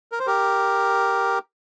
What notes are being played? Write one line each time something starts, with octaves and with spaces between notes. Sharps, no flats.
A#4
C5
G4 A#4